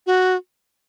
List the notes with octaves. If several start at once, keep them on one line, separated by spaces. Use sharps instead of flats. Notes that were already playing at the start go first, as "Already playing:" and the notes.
F#4